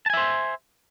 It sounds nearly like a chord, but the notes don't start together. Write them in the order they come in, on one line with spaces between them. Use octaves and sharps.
A5 G#5 E5 C5